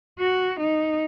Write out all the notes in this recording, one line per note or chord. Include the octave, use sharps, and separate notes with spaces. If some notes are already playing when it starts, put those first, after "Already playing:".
F#4
D#4